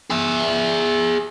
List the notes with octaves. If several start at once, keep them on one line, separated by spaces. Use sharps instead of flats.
G#4 E5